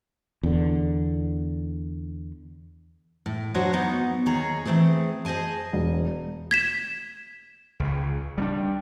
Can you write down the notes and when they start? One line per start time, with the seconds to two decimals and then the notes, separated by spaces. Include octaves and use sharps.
0.43 E2 D3
3.26 A2
3.54 F#3 D4 F#4 C5 C#5 D#5
3.73 F#3 B3 D#4
4.26 D#2 D#3 G#4 C#5 A#5
4.65 E3 G#3 A3 C4 G#4
5.25 G#4 C5 D#5 G#5 A5
5.73 E1
6.51 G#6 B6 E7
7.80 C#2 C#3
8.38 G3 B3 D4